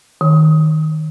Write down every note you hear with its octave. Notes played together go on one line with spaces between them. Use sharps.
D#3